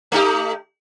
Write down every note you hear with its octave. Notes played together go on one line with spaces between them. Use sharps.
A3 D#4 G4